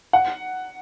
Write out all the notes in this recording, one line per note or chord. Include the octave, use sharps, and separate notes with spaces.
F#5